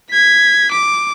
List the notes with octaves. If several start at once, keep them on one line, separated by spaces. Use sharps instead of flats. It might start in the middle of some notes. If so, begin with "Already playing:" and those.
G#6 B6
D6